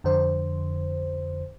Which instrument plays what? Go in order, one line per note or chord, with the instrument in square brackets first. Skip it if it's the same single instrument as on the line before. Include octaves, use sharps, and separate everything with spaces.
[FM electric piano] F2 D3 C5